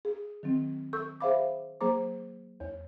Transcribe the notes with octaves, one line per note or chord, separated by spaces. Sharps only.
G#4
D#3 F#3 C4
A4 C#6 E6 G6
G#4 C5 E5 F5 B5 D6
F#3 A#3 G#4 C5 A#5 D6
E2 C#5